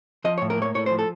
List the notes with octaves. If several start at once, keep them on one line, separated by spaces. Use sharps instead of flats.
F3 D#5
C#5
A2
A#4
A#3 C#5
A2 C#5
C5
F3
A4